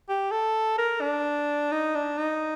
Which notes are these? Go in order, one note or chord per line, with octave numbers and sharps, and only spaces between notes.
G4
A4
A#4
D4
D#4
D4
D#4